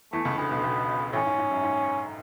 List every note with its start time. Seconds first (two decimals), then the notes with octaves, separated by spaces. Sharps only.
0.13 E2 E3 A3
0.25 C#2 C#3
0.38 D2 D3 B3
0.51 B1 B2
0.63 B1 B2
1.13 A1 A2 C#4
1.26 G#2
1.38 G#2
1.51 F#2
1.63 G#2